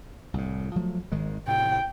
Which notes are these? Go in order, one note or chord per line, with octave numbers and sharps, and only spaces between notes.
C2 A2
F3 F#3 A3
G#1 D#3 G#3
A2 C3 G5